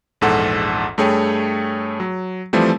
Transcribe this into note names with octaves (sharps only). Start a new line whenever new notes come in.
A#1 E2 G#2 A4 F#5
G2 A3 G#4 C#5 G5
F#3
E3 F3 G3 A3 C4